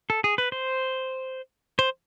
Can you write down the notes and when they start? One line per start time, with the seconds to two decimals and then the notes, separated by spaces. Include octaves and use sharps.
0.10 A4
0.24 G#4
0.38 B4
0.52 C5
1.79 C5